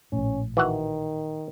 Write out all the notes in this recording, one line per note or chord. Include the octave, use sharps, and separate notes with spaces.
A#1 A2 C#4
D#3 E3 F#4 F#5